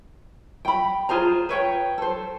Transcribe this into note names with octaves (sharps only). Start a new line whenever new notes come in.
G5 B5
F4 G#4 C5 A#5
B4 C#5 G5
A4 C5